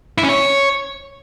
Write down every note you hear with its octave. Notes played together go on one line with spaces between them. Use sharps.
E4
C#4
C#5